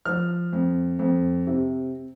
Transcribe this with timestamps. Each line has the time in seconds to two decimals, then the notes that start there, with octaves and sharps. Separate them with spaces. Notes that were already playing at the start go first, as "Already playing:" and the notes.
0.05 F3 F6
0.53 F2
0.99 F2
1.47 C3